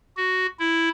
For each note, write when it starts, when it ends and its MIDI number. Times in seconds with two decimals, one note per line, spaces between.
0.17 0.46 66
0.59 0.89 64